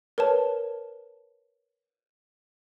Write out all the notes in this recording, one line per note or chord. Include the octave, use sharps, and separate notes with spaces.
A#4 B4 C#5 A5